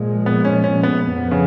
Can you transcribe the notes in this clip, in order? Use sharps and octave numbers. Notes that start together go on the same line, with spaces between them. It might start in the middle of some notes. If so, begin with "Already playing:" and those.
Already playing: A#2 F3 G#3
B3
C#4
C#4
B3
F2 F3 B3
C#3